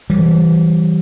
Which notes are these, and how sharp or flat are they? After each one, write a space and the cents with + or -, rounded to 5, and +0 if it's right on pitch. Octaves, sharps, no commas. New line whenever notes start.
E3 +0 G3 -25